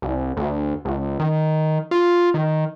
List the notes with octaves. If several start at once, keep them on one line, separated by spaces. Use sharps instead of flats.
C2
D2
C#2
D#3
F4
D#3